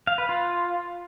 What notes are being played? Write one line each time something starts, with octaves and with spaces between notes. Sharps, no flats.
F5
B4
F4